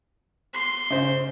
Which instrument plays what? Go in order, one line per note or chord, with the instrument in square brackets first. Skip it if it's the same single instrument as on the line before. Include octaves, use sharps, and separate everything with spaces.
[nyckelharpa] C6
[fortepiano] C#3 C5